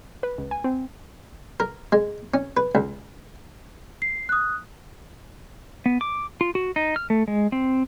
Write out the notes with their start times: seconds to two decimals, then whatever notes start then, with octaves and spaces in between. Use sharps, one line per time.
0.23 B4
0.38 C#2
0.51 G#5
0.64 C4
1.60 A#4
1.92 G#3
2.34 C#4
2.57 B4
2.75 C#2
4.02 C7
4.29 D#6 F#6
5.86 B3
6.01 D6
6.41 F4
6.55 F#4
6.76 D#4
6.96 F6
7.10 A3
7.28 G#3
7.52 C4